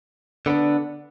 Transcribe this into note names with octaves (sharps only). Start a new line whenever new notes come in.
D3 B3 D4